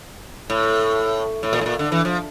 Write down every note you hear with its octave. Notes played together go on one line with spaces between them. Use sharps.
A2
A2
A#2
A2
A#2
D3
E3
F3